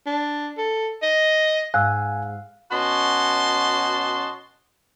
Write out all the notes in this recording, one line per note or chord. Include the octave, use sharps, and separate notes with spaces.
D4
A4
D#5
G#2 F5 G#5 E6 F#6
B2 C#4 F#4 D#5 A5 C6